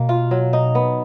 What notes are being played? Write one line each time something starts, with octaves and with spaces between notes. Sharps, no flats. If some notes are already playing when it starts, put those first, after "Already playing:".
Already playing: B2 A#3
F4
F#3
D#4
B3